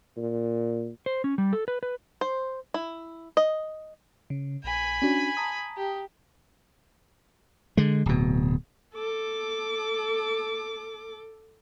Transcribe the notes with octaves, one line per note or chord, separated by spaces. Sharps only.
A#2
C5
C#4
G3
A4
B4
B4
C5
E4
D#5
C#3
A#1 G#5 B5
C#4 D4 F#4
A5 A#5 D#6
G4
D3 G#3
D1 B2
A4 D6